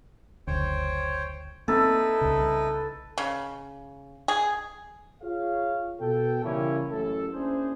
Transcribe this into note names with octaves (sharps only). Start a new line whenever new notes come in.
F#1 D2 C5 C#5 G5
A#3 C4 D#4 E4 A4 B4
C2 C#3
C#3
G#4
F4 G#4 C#5 F5
B2 A4 G5
C#3 E3 G3 A#3 C#4 E4
A1 F#2 A4
A#3 C#4 D4 E4 G#4 C5